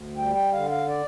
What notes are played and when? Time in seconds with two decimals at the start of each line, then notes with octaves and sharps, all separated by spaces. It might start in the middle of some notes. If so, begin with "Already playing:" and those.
Already playing: D2
0.17 G3 G5
0.35 G5
0.52 D3 F5
0.70 F5
0.88 D5